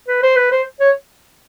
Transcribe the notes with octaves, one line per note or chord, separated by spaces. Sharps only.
B4
C5
B4
C5
C#5